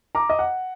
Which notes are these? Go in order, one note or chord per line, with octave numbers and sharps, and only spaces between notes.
A#5 D6
D#5
F#5